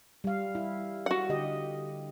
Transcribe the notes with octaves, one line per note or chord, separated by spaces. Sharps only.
G3 F5
E4
F#4 F#5
D3 G4 D#5